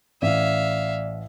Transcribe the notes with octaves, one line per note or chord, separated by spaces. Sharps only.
A1 D5 E5 F5